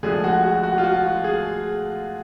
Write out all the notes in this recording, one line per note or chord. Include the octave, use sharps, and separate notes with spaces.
D2 D3 F3 G#3 G#4
F#4
F#4
F#4
F4
F#4
G#4